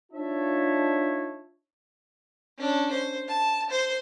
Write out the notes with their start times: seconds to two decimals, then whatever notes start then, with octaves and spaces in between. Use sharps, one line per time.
0.12 D4 D#4 F4 C#5 E5 A5
2.58 C#4 D4
2.92 C5
3.28 A5
3.70 C5